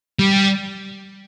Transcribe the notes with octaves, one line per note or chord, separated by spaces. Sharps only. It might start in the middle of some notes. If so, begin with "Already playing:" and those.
G3